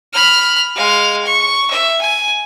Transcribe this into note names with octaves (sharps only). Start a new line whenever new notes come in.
B5 F6
G#3 F5
C#6
E5
G#5